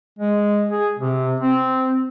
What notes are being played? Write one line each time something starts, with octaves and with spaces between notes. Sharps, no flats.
G#3
G#4
C3
C4